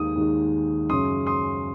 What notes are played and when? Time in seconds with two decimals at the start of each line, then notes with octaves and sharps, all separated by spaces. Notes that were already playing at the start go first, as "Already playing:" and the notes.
Already playing: D#2 D#3 G#3 D#4 D#6
0.16 D#2 D#3 G#3 D#4
0.90 F#2 C#3 G#3 C#4 C6 D#6
1.27 C6 D#6